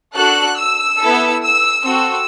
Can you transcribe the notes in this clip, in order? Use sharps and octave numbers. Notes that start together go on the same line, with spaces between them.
D4 F#4 A4 F#6
E6
B3 E4 A4
E6
C4 F#4 A4 E6